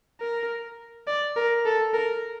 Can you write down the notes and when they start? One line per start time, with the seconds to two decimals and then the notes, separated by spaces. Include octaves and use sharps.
0.21 A#4
1.07 D5
1.36 A#4
1.65 A4
1.94 A#4